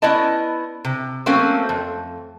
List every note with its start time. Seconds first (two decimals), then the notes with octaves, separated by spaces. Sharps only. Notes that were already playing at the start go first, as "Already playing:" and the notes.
0.02 B3 C#4 E4 D5 D#5 A5
0.85 C3
1.26 F#3 A3 A#3 C4 C#4
1.69 F2